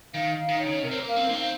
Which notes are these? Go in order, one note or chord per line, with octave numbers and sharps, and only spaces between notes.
D#3 F5
D#4
D#3
C#5
C#3
C3 A#4
C4
A#3
F5
C4
A#3 D#4
C4